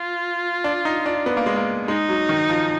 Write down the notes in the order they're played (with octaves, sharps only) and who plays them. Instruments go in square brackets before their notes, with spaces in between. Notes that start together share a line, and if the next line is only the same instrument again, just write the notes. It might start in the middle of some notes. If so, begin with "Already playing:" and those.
Already playing: [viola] F4
[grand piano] D4
D#4
D4
B3
A#3
G#3
A#3
[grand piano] G#3 [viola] D#4
[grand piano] F#3
D#3
F3